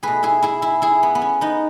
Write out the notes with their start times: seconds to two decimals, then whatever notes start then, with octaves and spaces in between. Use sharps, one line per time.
0.03 B2 A3 G#4 B4
0.23 E4 G#4
0.42 E4 G#4
0.62 E4 G#4
0.82 E4 G#4
1.03 B3
1.15 B3
1.22 C#4
1.41 B3 D#4